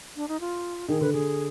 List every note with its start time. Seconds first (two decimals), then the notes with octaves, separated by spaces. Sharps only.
0.16 D4
0.28 D#4
0.40 F4
0.88 D#3 G#4
1.01 D3 B4
1.13 D3 G#4